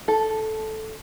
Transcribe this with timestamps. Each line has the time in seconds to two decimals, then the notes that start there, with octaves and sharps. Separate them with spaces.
0.08 A4